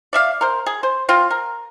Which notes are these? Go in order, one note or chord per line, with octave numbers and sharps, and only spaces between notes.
D5 E5 F5
A#4 C5
G#4
C5
C4 F4
A#4